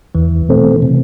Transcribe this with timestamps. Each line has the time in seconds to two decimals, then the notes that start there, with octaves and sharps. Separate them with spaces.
0.15 E2 E3
0.49 B2 A3 C4
0.82 C3